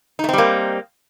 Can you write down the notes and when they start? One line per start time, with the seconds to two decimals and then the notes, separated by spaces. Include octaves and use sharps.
0.19 D#4
0.24 A3
0.29 C4
0.33 G3
0.38 A#3